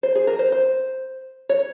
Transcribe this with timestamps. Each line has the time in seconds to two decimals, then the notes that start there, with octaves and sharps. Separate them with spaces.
0.03 C5
0.15 G#4
0.27 A#4
0.39 C5
0.52 C5
1.49 C#5